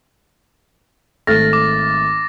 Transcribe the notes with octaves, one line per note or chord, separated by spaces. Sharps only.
G#1 A3 F6 A6 A#6
D6